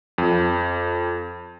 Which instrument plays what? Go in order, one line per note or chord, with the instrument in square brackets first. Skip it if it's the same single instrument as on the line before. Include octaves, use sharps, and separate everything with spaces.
[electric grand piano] F2